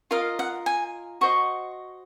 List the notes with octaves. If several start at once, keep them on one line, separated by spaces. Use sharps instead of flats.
F4 A#4 D#5 F5
F#5
G#5
F#4 C5 D#5 C#6